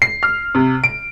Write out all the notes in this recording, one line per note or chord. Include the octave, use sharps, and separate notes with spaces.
C7
F6
C3
D7